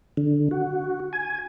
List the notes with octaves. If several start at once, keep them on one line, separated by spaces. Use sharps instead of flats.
D3
F#4
G#5